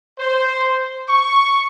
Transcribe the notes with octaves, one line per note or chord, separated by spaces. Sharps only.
C5
C#6